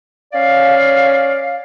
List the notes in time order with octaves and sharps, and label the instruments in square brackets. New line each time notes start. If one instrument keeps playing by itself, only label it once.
[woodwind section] C#4 D5 F5